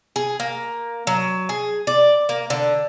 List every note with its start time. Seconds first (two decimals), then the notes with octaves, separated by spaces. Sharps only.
0.16 G#4
0.40 A#3
1.07 F#3
1.49 G#4
1.87 D5
2.29 A#3
2.50 D3